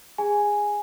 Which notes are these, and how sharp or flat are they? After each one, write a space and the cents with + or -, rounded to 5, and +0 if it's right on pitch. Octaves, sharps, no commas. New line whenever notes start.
G#4 -20 G#5 +0